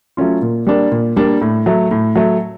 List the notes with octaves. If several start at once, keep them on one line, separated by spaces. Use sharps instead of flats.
F#3 A3 C#4 F4
A#2
G3 A#3 D4
A#2
G3 A#3 D4
A2
F#3 A3
A2
F#3 A3